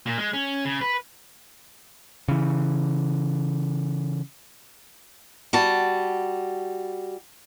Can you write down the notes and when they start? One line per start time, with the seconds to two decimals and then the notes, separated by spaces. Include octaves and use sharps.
0.06 A#2
0.18 G#3
0.33 C#4
0.65 C#3
0.81 B4
2.28 C#3 E3
5.53 G3 F#4 A5